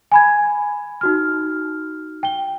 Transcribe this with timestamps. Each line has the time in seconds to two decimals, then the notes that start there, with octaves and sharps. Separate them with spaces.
0.12 G#5 B5 G#6
1.01 D#4 F#4 F6
2.23 G5 G7